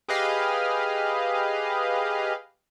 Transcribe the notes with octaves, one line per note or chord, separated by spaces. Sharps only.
G4 G#4 B4 D#5 F5